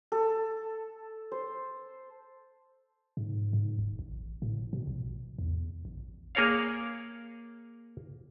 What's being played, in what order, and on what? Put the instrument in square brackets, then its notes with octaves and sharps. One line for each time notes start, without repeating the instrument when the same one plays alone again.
[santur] A4
C5
[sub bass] G#2
G#2
D#1
A1
A2
B2
A#1
E2
A1
[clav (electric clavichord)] A#3 G#4 A#4 C#5 D5 F5